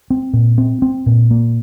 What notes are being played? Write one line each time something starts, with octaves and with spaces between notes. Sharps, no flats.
C4
A#2
C4
C4
A#2
A#3